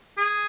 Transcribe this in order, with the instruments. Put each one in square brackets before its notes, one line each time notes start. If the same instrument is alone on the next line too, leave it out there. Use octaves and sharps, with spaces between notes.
[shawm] G#4